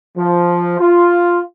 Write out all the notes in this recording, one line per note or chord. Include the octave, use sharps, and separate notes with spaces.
F3
F4